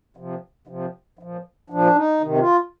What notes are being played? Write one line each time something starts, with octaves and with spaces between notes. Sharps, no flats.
C3 F3
C3 F3
A#2 F3
A#2 F3 D4
D#4
C3 D#3
F4